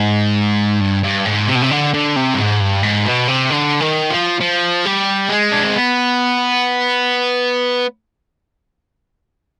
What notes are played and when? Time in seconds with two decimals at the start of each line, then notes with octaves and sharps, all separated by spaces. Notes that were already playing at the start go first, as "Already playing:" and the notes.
Already playing: G#2
0.81 G2
1.03 G2
1.26 G#2
1.48 C3
1.55 B2
1.62 C3
1.71 D3
1.93 D3
2.16 C3
2.34 G2
2.38 G#2
2.61 G2
2.83 G#2
3.06 B2
3.28 C3
3.50 D3
3.80 D#3
4.10 F3
4.40 F3
4.85 G3
5.29 G#3
5.52 D4
5.63 C4
5.75 B3